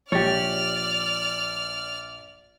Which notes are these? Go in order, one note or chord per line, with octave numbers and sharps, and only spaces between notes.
A#1 G4 C#5 D5 F6 A6